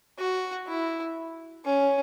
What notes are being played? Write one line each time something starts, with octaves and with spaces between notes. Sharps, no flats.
F#4
E4
C#4